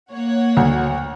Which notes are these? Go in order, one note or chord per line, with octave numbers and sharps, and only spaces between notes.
A#3 C#5 F#5
D2